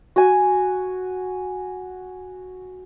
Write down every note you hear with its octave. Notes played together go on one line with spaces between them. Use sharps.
F#4 G#5